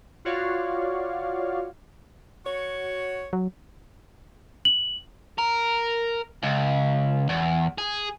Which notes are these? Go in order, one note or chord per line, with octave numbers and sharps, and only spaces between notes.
F4 F#4 C#5 D5 F5
F#4 C#5
F#3
F#7
A#4
C#2
E2
G#4